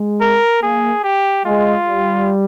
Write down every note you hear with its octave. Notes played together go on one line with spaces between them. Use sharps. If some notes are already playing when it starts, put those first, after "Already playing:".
Already playing: G#3
A#4
A#3 G#4
G4
G#3 F4
G3